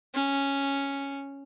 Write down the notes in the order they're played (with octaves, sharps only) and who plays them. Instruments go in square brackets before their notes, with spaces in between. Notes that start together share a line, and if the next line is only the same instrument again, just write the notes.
[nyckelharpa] C#4